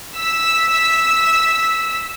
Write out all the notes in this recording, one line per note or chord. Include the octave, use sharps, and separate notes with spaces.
E6 B6